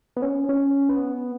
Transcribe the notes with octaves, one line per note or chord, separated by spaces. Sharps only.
B3
C#4
C#4
B3